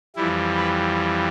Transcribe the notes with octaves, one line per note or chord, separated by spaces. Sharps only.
F2 E3 G3 E4
B4